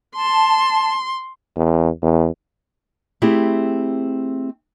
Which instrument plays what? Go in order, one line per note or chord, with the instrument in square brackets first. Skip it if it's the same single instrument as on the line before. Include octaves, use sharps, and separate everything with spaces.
[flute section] A5 [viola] C6
[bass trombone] E2
E2
[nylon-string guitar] A3 C4 E4 G4 G#4